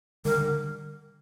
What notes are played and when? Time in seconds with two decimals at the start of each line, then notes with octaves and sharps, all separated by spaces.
0.25 D3 G3 A#4
0.38 D3 G3